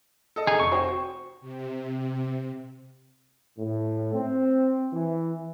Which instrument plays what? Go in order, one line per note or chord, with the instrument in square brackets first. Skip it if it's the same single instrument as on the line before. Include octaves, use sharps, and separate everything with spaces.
[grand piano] A4 D#5
[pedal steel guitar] D#4 G#4
[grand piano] F1 [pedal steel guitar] C#6
[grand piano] F#4 C5 G5
[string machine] C3
[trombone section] A2
C4
E3